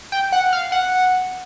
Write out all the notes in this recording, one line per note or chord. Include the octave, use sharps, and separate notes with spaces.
G5
F#5
F5
F#5